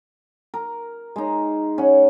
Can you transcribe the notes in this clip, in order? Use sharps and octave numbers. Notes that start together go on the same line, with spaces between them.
A#4
G#3 D#4
C#4 F#5